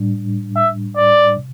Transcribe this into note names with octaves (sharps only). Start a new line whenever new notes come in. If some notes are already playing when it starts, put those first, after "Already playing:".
Already playing: A2 G3 D4
E5
D5
C3